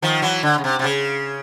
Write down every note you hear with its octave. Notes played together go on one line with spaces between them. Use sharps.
D#3 F3
E3 F#3
D3
C#3
C3
C3
C#3